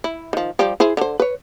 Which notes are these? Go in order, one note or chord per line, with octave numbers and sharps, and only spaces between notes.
E4
D#3 F3
F3 G3 G4
E4 G#4 C5
D3 C5
B4 C#5